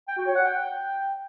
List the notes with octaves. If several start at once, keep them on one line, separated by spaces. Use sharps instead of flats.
G5
F#4
C#5
F#5
G5